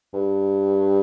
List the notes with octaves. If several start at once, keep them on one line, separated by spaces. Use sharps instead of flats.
G2